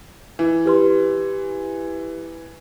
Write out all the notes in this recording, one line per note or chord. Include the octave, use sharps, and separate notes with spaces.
E3
G4 B4 C6